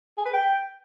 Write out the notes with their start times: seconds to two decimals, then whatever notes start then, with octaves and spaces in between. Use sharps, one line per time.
0.17 G#4
0.25 B4
0.33 G5